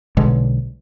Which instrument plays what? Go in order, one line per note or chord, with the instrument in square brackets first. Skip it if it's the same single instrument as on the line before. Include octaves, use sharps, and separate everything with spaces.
[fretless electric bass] B1 B2 D3 G#3